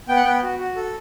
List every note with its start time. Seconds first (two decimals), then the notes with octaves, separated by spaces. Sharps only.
0.09 B3 G5
0.16 F#5
0.25 B3 G5
0.43 F#4
0.59 F#4
0.76 A4